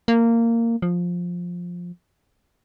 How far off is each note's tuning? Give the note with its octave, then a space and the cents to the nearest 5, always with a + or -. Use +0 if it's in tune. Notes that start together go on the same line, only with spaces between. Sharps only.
A#3 -15
F3 +10